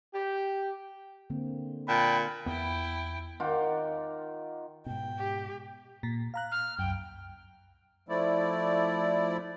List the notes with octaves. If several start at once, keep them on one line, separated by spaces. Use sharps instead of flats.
G4
D3 A#3 C4
A#2 G5 A5 B5
E2 B3 E4 G5
D#3 F4 F#5 D6
G#2 B2 G5
G4
A#2
F5 A#5 F#6
F6
C2 F#2 G5
F3 A3 E4 D5